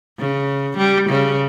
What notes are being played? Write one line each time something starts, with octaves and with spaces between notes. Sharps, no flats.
C#3
G3
C#3